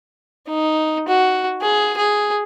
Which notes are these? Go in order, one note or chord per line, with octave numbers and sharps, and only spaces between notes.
D#4
F#4
G#4
G#4